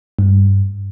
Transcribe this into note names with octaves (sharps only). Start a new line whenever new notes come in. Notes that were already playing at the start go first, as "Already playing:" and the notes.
G2